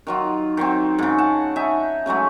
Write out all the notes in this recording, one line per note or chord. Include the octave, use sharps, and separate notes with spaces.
D#3 F#3 F4
D#3 F#3 C4
G#2 C#3
F#5 A5
D#4 E5 G#5
C#3 F#3 G#3 A3